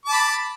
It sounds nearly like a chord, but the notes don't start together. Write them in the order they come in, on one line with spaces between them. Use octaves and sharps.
D6 A5 B5